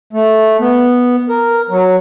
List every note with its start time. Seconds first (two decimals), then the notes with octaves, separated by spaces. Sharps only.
0.13 A3
0.60 B3
1.29 A#4
1.70 F#3